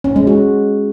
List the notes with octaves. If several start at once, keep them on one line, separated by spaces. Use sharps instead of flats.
C#4
G#3
F#4